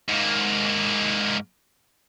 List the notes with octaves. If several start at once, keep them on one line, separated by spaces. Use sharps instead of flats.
G#2 A#3